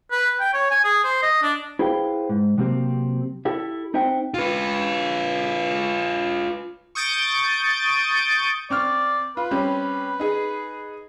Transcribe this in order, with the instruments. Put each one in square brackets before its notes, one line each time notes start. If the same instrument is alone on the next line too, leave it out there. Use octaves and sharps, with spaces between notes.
[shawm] B4
G5
C#5
G#5
G#4
C5
D#5
D4
[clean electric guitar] E4 G#4 B4 C5 F5 G5
G#2
C3 F#3 A#3 C4 G4
E4 G4 A4 E5
C4 D#4 C5 E5 F#5 G5
[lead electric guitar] F4 B4
[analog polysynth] C#6 D#6 G6 A6 D7
[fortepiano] C4 C#6 F6 [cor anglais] D5
[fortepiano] F4 [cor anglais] B4
[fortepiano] G3 C4 C#4
D#4 G#4